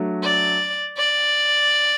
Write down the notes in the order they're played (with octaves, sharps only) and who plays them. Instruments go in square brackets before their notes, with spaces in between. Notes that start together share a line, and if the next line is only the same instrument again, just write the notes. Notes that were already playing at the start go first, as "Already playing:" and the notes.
Already playing: [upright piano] F#3 A3 D4
[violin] D5
D5